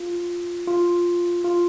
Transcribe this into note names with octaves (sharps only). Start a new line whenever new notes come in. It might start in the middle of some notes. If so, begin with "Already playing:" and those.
Already playing: F4
F4
F4